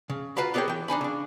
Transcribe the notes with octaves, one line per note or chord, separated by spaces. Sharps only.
C#3
F4 F#4 B4 F5 A#5 B5
B3 G4 G#4 A#4 C#5 G5
E3 G5
D4 D#4 G#5 B5
C#3 D4